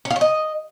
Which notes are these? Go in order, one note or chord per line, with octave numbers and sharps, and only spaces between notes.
C#4
F5
C#5
D#5